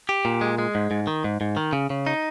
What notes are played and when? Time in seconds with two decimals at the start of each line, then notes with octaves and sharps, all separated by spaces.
0.09 G4
0.25 A#2
0.41 G#3
0.58 G#3
0.75 G#2
0.91 G#2
1.07 D#3
1.24 G#2
1.41 G#2
1.57 D#3
1.73 C#3
1.90 C#3
2.07 D#4